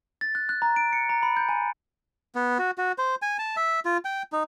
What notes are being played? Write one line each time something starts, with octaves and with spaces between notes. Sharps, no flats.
A6
F#6
F#6
A#5
D7
C#7
A#5
B5
G6
G#5
B3
F#4
F#4
C5
G#5
A5
E5
F4
G5
D#4